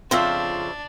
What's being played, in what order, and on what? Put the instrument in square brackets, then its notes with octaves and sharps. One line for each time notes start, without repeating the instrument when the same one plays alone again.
[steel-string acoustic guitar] F2 C#3 [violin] D4 [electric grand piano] F4 F5 [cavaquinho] C5 E5